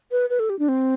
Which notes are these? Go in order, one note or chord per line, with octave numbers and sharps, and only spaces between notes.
B4
B4
A4
G4
D4
C4